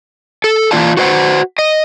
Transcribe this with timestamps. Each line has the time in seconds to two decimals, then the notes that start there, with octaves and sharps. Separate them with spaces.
0.44 A4
0.71 E3 A#3 F4 D5 F5 A5
0.97 F#4 B4 C5 D#5 F#5
1.59 D#5